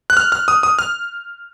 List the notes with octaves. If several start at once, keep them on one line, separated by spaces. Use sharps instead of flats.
F#6
F6
F6
D#6
D#6
F6